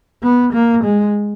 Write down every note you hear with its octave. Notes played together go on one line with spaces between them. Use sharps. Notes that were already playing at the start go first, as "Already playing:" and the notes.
B3
A#3
G#3